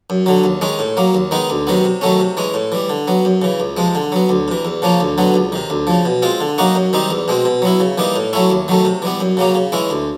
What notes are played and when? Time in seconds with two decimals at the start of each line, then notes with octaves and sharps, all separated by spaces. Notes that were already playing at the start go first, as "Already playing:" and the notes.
0.10 F#2
0.26 D3 F#3
0.44 D#2
0.61 D#3 G#3 C#4
0.79 A2
0.97 F#3 A#3
1.15 D#2
1.31 D#3 G#3 B3 D#4
1.50 D2
1.67 C3 D#3 F#3 B3
1.84 C3
2.01 D#3 F#3 A3 C#4
2.20 C3
2.37 E3 G#3 C#4
2.54 A2
2.72 E3 G3
2.90 D3
3.08 F#3 B3
3.25 F#2
3.42 C#3 E3
3.60 C#2
3.77 C3 F3 G#3
3.95 D3
4.12 F#3 B3
4.29 D2
4.48 C3 E3
4.65 E2
4.82 C#3 F3 A#3 C#4
5.00 D2
5.18 D3 F#3 B3
5.34 C#2
5.52 C3 D#3
5.70 D2
5.87 C#3 F3
6.06 B2
6.22 G#3 C4 F4
6.41 D3
6.58 F#3 A#3 D#4 F#4
6.75 F#2
6.93 D#3 G3 C4 D#4
7.10 E2
7.28 B2 G#3 C4
7.45 B2
7.62 F#3 B3 E4
7.80 C#3
7.98 E3 G3 A#3 D#4
8.16 A2
8.33 F#3 A3 C#4 E4
8.50 D#2
8.68 D#3 F#3 A3
8.85 C3
9.02 E3 G3 B3
9.20 F#2
9.37 C#3 F#3 A#3 C#4
9.55 C#3
9.72 E3 G#3 C#4 E4
9.90 D2